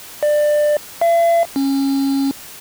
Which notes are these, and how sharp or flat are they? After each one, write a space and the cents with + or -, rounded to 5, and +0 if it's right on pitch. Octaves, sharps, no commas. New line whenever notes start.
D5 +20
E5 +45
C#4 -20